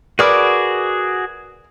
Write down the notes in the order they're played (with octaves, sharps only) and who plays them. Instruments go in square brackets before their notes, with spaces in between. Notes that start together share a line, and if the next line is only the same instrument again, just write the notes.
[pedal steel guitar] F#4 G#4 D6 [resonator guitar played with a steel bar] A#4 B4 D5